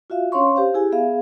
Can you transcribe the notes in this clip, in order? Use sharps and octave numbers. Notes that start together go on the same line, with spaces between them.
F4 F#4 E5 F5
C#4 D4 C#5 F5 C6 C#6
G4 C5 F5
E4 G4 G#4 G#5
B3 G#4 E5 F5